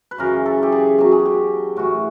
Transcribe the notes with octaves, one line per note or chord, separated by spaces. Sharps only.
B4
F#2 C#3 E3 A#4
A4
G4
G#4
B2 F#3 G4
G#4
G4
A2 E3 F#4